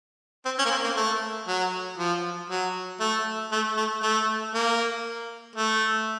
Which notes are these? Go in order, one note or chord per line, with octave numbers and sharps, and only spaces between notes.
C4
C#4
A#3
C4
A#3
A3
F#3
F3
F#3
A3
A3
A3
A3
A#3
A3